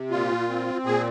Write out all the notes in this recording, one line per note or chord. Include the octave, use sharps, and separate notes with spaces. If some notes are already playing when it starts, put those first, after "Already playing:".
Already playing: C3
A#2 F4
C4
A#2 G#4